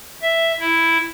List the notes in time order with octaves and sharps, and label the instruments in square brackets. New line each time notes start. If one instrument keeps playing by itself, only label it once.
[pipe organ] E5
E4